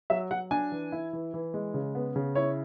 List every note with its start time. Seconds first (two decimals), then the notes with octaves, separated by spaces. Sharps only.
0.10 F#3 E5
0.31 F#3 F#5
0.51 D4 G#5
0.72 E3
0.92 E4
1.13 E3
1.34 E3
1.54 G#3
1.74 C#3
1.95 B3
2.16 C#3
2.35 E4 C#5